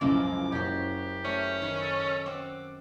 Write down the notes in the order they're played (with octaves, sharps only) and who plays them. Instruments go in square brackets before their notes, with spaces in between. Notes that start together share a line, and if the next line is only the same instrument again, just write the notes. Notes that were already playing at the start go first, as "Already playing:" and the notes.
[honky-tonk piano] C#2 A2 C#3 [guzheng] F#2 F3 G#3 [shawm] D6
[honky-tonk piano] F#1 [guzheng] F#4 C#5 [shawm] G4
[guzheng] A3 [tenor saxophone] C#4
[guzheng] D#3 G#5 B5
[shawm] A4
[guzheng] C4 F#5 [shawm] D6